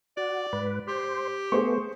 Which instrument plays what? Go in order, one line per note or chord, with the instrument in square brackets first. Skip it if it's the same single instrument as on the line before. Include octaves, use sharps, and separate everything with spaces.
[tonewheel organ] F#4 [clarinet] D5
[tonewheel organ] G#2 B4
[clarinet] G4 [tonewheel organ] C5
[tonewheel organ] A3 B3 [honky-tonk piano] G#4 C5 C#6